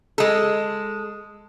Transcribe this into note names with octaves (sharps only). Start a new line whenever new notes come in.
G#3 A4